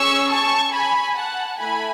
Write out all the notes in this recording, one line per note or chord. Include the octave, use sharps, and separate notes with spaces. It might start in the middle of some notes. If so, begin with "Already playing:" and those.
Already playing: C#4 G#4 C#6 E6
A5 C#6
G#5 B5
F#5 A5
A3 E4 G#5 B5